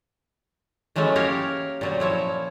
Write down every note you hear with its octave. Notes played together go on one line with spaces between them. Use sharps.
E3 F#3 G#3 A3 C#4 E4
A#3 G4 A#4 C#5 F5
A#2 F#3 G3
F3 E4 C#5